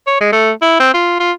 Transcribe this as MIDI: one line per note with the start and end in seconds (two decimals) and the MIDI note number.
0.07 0.16 73
0.21 0.29 56
0.33 0.51 57
0.62 0.78 64
0.79 0.92 60
0.94 1.19 65
1.20 1.32 65